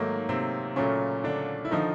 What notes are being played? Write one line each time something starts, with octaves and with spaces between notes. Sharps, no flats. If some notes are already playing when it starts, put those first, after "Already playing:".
Already playing: G#2 D#3 F#3 A3 A#3
C3 C4
A#2 C#3 F#3 A3 C#4
D3 D4
E4
D3 D#3 F3 D#4